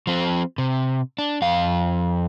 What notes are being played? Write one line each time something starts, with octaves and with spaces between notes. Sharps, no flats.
F3 C4
C3
D4
F2 F5